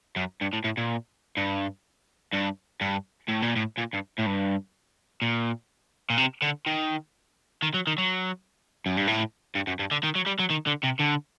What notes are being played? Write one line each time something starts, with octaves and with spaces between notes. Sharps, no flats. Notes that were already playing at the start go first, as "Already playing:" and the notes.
F#2
G2
A2
A2
A#2
G2
G2
G2
A2
A#2
A2
A#2
G2
A2
G2
A#2
A#2
C3
D3
D#3
D#3
F#3
D#3
F#3
F#2
G2
A2
G2
F#2
G2
D3
D#3
F#3
G3
F#3
D#3
D3
C3
D3